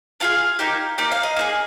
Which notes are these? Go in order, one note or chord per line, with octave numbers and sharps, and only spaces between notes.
D4 F4 G#4 F5
A#3 D#4 G4
A#3 D#4 G4
F5
D#5
A#3 D#4 G#4